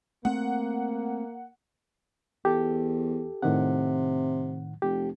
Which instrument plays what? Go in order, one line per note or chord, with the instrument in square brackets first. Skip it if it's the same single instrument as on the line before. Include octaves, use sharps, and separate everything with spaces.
[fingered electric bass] A3 C4 [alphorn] A#3 [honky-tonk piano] F#5
[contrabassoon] E2 [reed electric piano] G4 A4
[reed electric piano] A2 D#3 F#5 [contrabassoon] C3
[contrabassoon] F1 [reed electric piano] G4